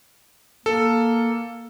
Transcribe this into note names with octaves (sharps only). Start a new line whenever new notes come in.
A#3 A4